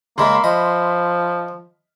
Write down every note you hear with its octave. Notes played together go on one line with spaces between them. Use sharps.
C#3 G#3 A#3 E5 B5 C6
F3 D#5